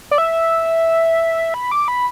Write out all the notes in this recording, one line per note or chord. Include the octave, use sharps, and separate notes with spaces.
D5
E5
B5
D6
B5